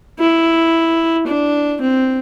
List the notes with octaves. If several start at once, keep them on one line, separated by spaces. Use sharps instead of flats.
E4
D4
C4